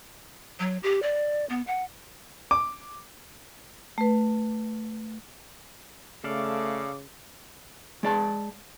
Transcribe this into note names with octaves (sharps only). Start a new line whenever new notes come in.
F#3
G4
D5
B3
F#5
D6
A3 B4
C#3 A3 A4 D5 F5 D6
G#3 D5 A5